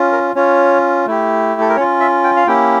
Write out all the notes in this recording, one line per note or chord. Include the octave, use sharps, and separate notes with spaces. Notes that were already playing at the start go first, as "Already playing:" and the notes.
Already playing: C#4 F4
A#4
C#4 F4 C#5
A3 E4 G4
A4
A#4
C#4 F4 C#5
E5
G5
F5
A#3 C#4 E4 G4 G5